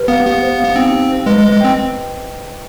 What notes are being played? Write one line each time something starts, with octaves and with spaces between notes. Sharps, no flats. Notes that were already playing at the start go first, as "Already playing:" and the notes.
Already playing: G4 B4
B3 F5
B3 G4
C5
F5
B3
C4 D#4
G4
C5
G#3 B4
G#3
D#5
G#3
C4 G5